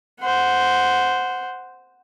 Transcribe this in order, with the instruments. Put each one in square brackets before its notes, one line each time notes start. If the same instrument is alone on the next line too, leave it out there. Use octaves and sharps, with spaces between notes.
[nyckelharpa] C5 F#5